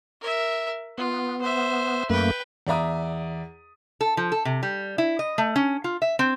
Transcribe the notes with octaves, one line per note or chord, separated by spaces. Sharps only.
A#4 E5
B3 F4
C5 E5
F#2 A3 A#3 B4 G5
E2 D5 E5 A#5 D#6
A4
F3
A4
C3
G3
E4
D#5
A3
C#4
F4
E5
C4